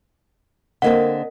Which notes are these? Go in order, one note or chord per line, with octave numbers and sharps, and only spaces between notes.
D3 A#3 C4 A#4 D#5 F#5